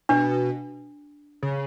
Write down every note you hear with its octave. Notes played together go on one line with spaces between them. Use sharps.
B2 D4
C#3